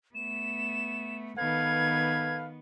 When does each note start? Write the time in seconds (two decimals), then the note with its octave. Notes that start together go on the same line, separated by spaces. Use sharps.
0.15 A3 B3 E7
1.37 D#3 B3 A4 B4 F5 G#6